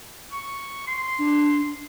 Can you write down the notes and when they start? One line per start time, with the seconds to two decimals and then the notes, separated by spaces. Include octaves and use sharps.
0.32 C#6
0.87 C6
1.19 D4